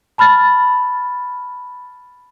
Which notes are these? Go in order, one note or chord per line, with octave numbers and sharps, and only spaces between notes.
A5 B5 F6 A6